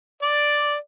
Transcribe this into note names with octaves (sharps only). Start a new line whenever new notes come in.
D5